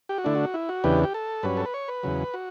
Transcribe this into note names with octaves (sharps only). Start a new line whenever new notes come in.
G4
F#4
D3 A3 D4 E4
F#4
E4
F#4
E2 C#3 E3 B3 D4 G4
G4
A4
G2 F#3 C#4 B4
A4
B4
C#5
B4
E2 C#3 F#3
F#4